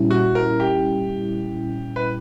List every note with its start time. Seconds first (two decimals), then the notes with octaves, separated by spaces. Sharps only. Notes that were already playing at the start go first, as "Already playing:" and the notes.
Already playing: A#2 G3 C#4 E4
0.11 F#4
0.35 A#4
0.60 G4
1.96 B4